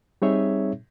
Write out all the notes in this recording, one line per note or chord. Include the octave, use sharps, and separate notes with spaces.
G3 C4 D#4 G#4 C#5 E5